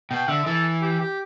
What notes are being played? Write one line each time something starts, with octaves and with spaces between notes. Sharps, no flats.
B2 G5
D3 E5
E3 A4
G4
G4